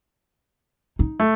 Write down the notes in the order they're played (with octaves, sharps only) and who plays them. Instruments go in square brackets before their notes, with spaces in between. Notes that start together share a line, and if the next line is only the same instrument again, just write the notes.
[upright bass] D#4
[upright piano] A3